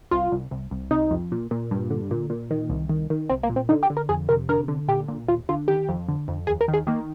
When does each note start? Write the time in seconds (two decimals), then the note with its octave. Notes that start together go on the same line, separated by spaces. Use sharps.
0.11 C2 F4
0.32 C2
0.51 C2
0.71 C2
0.91 C3 D#4
1.11 F2
1.32 A#2
1.51 A#2
1.71 G2
1.90 D3
2.11 A#2
2.30 A#2
2.51 D#3
2.70 C2
2.89 D#3
3.10 D#3
3.30 C2 C4
3.43 A#3
3.50 A#2
3.56 C4
3.69 D3 D#4
3.83 G4
3.90 D3
3.97 A#4
4.09 F2 G#4
4.29 C3 A#4
4.49 D3 A#4
4.68 D3
4.88 A#2 G4
5.08 A#2
5.28 D#2 F4
5.49 D3 F4
5.68 D#3 G4
5.89 F2
6.08 D3
6.28 F2
6.47 D#2 G#4
6.61 A#4
6.68 D#3
6.74 G#4
6.87 D#3 A#3